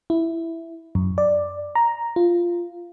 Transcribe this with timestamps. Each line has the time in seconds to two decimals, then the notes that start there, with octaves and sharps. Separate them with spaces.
0.10 E4
0.95 F#2
1.18 D5
1.75 A#5
2.16 F4